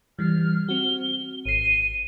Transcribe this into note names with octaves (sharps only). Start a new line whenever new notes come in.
E3 G3 F6
C4 F#4 G7
G#1 C7 D#7